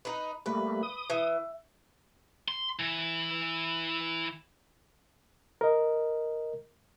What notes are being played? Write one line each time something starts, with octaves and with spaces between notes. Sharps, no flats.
D#4 B4
G3 A3 A#3 B4
D#6
E3
C6
E3
A#4 D#5